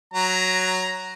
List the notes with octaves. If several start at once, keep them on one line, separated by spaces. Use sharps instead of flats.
F#3 A#5